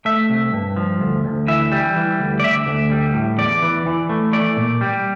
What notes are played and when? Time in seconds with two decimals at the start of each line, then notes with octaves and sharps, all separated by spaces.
0.05 A3 E5
0.30 C2
0.54 G2
0.76 F3
1.01 D2
1.25 D2
1.48 E3 E5
1.72 G3
1.96 E3
2.20 D2
2.40 D5
2.43 D2 E5
2.67 D2
2.91 G3
3.14 A2
3.38 E2 D5
3.62 E3
3.86 E3
4.09 A3
4.33 A3 D5
4.57 A#2
4.81 G3